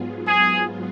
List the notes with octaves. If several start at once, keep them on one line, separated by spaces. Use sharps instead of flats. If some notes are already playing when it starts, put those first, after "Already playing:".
Already playing: G#2 F#3 B3 F4 G#4
G#4